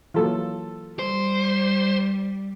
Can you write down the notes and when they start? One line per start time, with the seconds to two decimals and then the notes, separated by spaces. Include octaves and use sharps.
0.14 E3 F#3 A#3 F4 A4
0.99 G3 C5